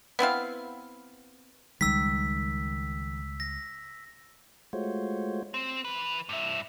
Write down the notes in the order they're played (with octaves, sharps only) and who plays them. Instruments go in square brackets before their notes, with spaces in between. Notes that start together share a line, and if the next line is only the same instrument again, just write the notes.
[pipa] B3 C4 E4 F5
[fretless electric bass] C#2 G3 G#3 [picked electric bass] D#3 [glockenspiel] E6 B6
[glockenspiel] A#6
[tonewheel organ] G#3 A3 F4 F#4 C5 C#5
[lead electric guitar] C4
E3 B4
G2 E4